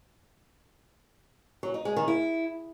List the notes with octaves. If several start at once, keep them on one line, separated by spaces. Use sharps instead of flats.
F#3
D#4
G#3
D#3
E4